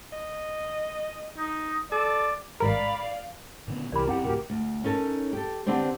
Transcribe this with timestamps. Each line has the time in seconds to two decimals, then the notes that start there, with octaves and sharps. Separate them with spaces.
0.12 D#5
1.38 D#4
1.92 A4 D5
2.60 A1 G#2 A#4 D5 F5 B5
3.68 A#2 D3 B3
3.92 C2 E3 G4 A#4 D5 B5
4.07 F#2 C4 E4 G4 F#5 G5
4.24 D2 A2 F#4 G4 A#4 G5
4.50 D2
4.84 C#4 D#4 A4 A#4
5.33 G4 A4
5.66 D3 B3 C4 D4 G4 C5